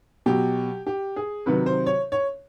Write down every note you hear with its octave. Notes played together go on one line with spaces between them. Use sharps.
B2 F#3 G4
G4
G#4
C3 D#3 F#3 B4
C5
C#5
C#5